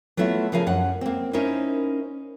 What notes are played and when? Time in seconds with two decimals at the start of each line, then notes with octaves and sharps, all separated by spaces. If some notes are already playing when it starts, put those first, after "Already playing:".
0.17 F#3 A3 B3 E4 F4
0.52 C#3 F3 A#4 F5 G#5
0.67 F#2 F#5
1.01 A#3 C4
1.33 C#4 D#4 E4 A#4 C5